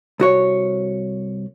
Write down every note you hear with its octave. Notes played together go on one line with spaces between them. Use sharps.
C2 F#4 C#5